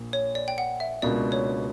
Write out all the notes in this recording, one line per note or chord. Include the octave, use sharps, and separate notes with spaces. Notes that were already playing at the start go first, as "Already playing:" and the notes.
Already playing: A#1 A#2
C#5
D5
G5
F#5
E5
C#2 B2 A#3 D4 D5
C#5